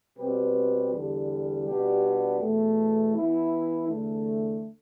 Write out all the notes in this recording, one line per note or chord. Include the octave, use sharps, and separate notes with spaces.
B2 G3 C4 G4 B4
E2 D3 G3
B2 G3 B3 D4 G4
E2 B2 A3
E3 B3 E4
E2 D3 A3